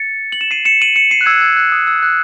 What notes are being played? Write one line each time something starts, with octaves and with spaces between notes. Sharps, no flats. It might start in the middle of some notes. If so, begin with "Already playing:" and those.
Already playing: A6 C#7
F#7
E7
C7 D#7
C#7 E7
D#7 F#7
C#7 E7
C7 D#7
F#6
E6 G#6
F#6
E6 G#6
F#6
D#6
E6
F#6